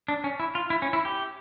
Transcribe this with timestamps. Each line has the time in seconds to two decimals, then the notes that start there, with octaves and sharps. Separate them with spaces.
0.08 D4
0.24 C#4
0.40 E4
0.55 F4
0.70 E4
0.82 C#4
0.93 E4
1.05 G4